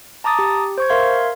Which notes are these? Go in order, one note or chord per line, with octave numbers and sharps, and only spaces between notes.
A5 A#5 D6 D#6 A6
G4
C5 C#6 G#6
A#4 E5 F5 C6 G#6